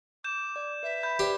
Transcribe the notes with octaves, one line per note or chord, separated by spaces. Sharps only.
D6 G6 E7
D5
B4 E5
B5 G6
G4 B4 C5 D5